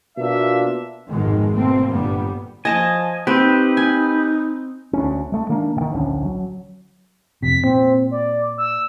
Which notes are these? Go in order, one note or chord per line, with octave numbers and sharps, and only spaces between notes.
B2 A#3 D4 F4 E5
G#1 F2 B2 D#3 G#3
B2 A3 A#3 C4
G1 A#2 G3 B3
F3 D#5 G#5 A5
C4 D#4 G4 B4
G#5
D2 A3 C#4
G#3 A3
D#3 A#3 D4
B2 D#3
D1 A#1 D3 C#4
F#3
F2 C3 B6
A#2 C4
D5
E6